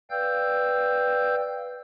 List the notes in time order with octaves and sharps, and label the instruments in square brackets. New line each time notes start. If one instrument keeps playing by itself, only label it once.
[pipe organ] B4 D5 F5 G5 E6 G6